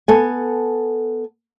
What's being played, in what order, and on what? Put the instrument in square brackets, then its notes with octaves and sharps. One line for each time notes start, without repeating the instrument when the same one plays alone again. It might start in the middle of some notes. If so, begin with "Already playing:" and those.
[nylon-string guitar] B3 A4 G#5